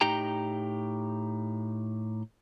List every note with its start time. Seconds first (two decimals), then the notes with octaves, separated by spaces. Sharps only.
0.01 A2 D#4 G4 G5 A#5